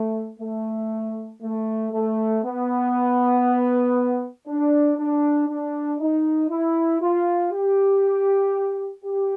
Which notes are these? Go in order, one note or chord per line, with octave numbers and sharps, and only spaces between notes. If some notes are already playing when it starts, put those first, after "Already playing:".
Already playing: A3
A3
A3
A3
B3
D4
D4
D4
D#4
E4
F4
G4
G4